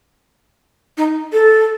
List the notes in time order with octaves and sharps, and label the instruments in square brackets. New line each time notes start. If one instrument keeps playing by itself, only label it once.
[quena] D#4
A4